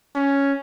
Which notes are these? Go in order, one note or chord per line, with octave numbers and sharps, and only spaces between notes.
C#4